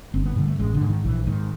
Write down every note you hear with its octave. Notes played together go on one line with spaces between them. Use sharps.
G1 C4
B3
G2 D3
A3
A1 G#3
D3
G#2
D#3
A#1 E3
G#2 D#3